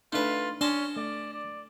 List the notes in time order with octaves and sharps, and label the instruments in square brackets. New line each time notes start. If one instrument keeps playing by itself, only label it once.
[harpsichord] A3 B4 [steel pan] D4 D#4 [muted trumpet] F4
[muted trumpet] C#4 [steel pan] D4 [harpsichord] D#5 A5 C6
[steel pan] A3 [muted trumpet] D5
[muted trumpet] D5